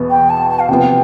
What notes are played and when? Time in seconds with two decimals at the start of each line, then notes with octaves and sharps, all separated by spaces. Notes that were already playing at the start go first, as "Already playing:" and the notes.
Already playing: E2 B2 B3
0.10 G5
0.29 A5
0.49 A5
0.59 F5
0.69 C3 F3 B3 G5